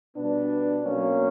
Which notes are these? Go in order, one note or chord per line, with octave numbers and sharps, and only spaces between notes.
B2 G3 B3 D4
B2 F#3 A#3 C#4